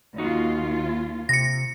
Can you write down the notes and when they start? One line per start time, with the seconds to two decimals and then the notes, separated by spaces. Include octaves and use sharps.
0.18 D#2 D#4 F4 F#4
1.29 C3 A#6 C#7